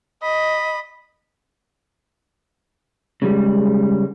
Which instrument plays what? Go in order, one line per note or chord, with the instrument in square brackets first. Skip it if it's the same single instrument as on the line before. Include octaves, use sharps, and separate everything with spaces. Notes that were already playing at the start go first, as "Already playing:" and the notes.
[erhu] D#5 [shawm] B5
[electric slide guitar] C#3 G3 [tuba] G#3